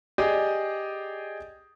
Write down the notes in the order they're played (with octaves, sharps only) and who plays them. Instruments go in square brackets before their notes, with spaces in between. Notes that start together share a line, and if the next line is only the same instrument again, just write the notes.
[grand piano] G4 G#4 D5 D#5